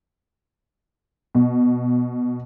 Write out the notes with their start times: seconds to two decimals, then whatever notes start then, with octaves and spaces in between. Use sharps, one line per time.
1.35 B2